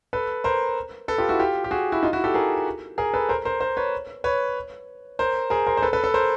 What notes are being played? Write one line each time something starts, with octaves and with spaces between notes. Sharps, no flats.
A4 B4
A#4 C5
A4 B4
F4 G4
E4 F#4
F4 G4
G4
F#4 G#4
E4 F#4
D#4 F4
E4 F#4
G4 A4
G#4 A#4
G#4 A#4
A4 B4
A#4 C5
A#4 C5
A#4 C5
B4 C#5
B4 C#5
A#4 C5
G#4 A#4
A#4 C5
C5
A4 B4
A4 B4
A4 B4
A#4 C5